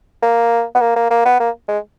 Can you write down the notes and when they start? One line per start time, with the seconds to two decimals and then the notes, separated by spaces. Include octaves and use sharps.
0.22 A#3
0.75 B3
0.81 A#3
0.96 A#3
1.11 A#3
1.25 B3
1.40 A#3
1.68 G#3